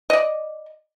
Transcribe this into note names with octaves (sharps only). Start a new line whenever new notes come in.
D5 D#5